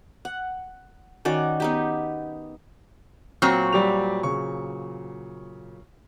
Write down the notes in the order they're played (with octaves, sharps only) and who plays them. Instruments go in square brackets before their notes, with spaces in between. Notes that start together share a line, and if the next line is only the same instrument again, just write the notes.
[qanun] F#5
D#3 C#4 F#4 D5
B3 D#4 G4
[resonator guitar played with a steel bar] A#2 F#3 C4 [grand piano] C#6
[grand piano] G3 G4 F7
C#3 C#6